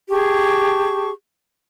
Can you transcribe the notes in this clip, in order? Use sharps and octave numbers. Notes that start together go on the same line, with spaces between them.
G4 G#4 A5 C#6